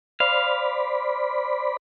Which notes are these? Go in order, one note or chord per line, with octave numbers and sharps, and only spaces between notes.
C5 D5 F5 B5